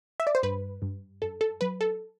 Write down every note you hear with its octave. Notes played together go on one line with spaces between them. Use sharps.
E5
D5
C5
G2 B4
G2
F#2 A4
A4
F#3 B4
A4